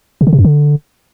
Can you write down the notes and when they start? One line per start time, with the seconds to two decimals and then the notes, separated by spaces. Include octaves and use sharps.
0.21 C3
0.27 D3
0.33 C3
0.39 F#2
0.44 D3